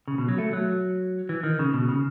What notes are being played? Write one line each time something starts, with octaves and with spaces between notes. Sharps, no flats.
C#3
B2
F#3
A3
F#3
E3
D#3
C#3
B2
C#3